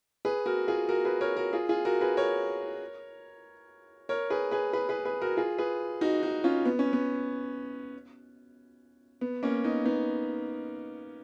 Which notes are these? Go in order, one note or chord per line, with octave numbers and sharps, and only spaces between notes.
G#4 B4
F#4 A#4
F4 G#4
F#4 A#4
G#4 B4
A#4 C#5
F#4 A#4
F4 G#4
F4 G#4
F#4 A#4
G#4 B4
A#4 C#5
A#4 C#5
G#4 B4
G#4 B4
G#4 B4
G#4 B4
G#4 B4
F#4 A#4
F4 G#4
G#4 B4
D#4 F#4
D#4 F#4
C#4 F4
B3
C#4
B3
B3
A#3 C#4
B3 D#4
B3 D#4